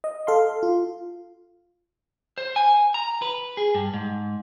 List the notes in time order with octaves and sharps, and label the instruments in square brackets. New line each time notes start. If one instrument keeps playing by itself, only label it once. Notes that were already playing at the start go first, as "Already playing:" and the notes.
[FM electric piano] D#5
A4 F5 C6
F4
[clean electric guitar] C5
G#5
A#5
B4
G#4
G2
G#2